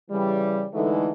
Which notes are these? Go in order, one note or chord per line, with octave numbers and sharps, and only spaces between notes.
C#3 E3 G3
D3 E3 G#3 A3 D#4